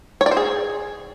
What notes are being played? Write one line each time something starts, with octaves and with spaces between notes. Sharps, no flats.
C#5
D5
C5
G#4